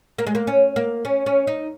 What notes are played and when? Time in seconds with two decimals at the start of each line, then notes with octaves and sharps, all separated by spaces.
0.18 A#3
0.27 G#3
0.35 A#3
0.47 C#4
0.76 A#3
1.05 C#4
1.26 C#4
1.47 D#4